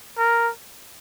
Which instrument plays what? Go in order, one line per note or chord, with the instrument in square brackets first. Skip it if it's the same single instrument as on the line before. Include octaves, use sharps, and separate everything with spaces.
[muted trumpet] A#4